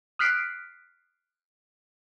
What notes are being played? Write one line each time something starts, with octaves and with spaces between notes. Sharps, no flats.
D#6 F6 F#6 B6 C7 D7